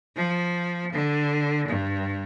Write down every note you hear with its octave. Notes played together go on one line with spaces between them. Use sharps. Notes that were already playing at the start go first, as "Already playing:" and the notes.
F3
D3
G2